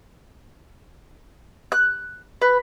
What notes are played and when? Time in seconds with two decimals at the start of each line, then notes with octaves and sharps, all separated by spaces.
1.72 F#6
2.42 B4